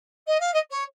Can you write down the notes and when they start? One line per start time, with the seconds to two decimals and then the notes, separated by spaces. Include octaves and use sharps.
0.27 D#5
0.40 F5
0.53 D#5
0.70 C#5